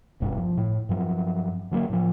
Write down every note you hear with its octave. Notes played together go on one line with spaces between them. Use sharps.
D#1 G#1 G2 B2
F3
A2
G2 F3 F#3
D3 F#3 A3 A#3
A2 F3